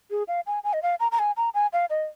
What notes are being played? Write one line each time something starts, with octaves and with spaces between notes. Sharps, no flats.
G#4
F5
G#5
G#5
D#5
F5
A#5
A#5
G#5
A#5
G#5
F5
D#5